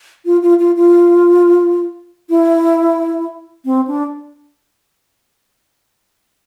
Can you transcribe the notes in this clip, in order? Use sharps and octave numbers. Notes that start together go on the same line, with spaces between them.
F4
F4
F4
F4
E4
C4
D4